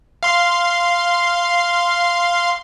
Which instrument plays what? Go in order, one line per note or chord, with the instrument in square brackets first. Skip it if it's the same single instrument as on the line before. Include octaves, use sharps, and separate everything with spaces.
[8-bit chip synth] F5 C6